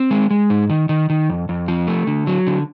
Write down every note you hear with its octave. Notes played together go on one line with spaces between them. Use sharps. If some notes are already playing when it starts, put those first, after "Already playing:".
Already playing: C4
G#3
G#3
G#2
D#3
D#3
D#3
F2
F2
F3
A3
D3
F#3
D3